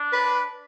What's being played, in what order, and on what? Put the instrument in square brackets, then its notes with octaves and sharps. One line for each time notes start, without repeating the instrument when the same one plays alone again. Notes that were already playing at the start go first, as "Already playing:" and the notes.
Already playing: [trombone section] D4
[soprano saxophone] B4